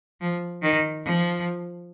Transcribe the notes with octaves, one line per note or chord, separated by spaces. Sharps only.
F3
D#3
F3